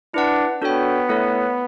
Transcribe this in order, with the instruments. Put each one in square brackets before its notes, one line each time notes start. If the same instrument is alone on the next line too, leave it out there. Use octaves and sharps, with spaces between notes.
[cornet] D4 [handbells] E4 B4 F#5 A5
[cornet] B3 [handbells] D4 F#4 A4 C#5 G5
[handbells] A3 E4 A4 C#5